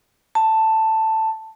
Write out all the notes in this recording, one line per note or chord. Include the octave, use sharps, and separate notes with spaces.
A5